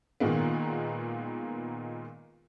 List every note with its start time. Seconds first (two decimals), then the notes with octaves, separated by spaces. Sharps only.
0.20 A#2 D#3 G#3 A#3 B3